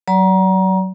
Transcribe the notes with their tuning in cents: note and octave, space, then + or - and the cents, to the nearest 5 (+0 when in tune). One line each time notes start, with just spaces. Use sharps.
F#3 +20 D5 -35 A#5 +25